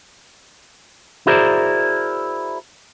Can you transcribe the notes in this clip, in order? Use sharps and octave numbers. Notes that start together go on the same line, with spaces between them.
E4 F#4 G#4 A#4 C5 D5